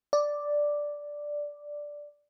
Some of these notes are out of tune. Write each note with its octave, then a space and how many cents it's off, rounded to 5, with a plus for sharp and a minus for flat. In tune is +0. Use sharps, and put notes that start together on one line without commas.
D5 +0